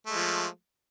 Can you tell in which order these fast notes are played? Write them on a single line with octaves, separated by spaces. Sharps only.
A3 G#3 F3